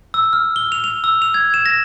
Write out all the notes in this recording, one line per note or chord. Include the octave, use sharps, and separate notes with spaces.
E6
F6
G7
F7
F7
E6
F7
G#6
E7
A#6